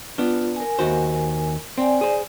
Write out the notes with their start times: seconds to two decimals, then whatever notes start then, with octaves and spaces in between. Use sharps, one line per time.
0.18 B3 D4 F4
0.56 A#4 G#5
0.79 D#2 F#4 C5
1.78 C4 D5 G#5
2.01 G#4 C5